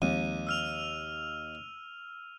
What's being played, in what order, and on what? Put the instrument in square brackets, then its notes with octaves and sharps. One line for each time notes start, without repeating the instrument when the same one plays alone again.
[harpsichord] D#2 [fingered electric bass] F3 G#3 C4 [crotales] D#7
[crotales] E6 F6 F7